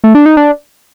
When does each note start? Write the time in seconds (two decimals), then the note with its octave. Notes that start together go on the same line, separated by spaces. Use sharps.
0.04 A3
0.15 D4
0.26 D#4
0.37 D4